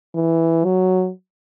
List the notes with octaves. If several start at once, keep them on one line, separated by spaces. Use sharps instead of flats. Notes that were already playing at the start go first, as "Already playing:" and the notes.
E3
F#3